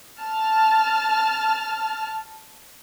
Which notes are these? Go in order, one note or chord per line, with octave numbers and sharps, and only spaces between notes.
A5 F6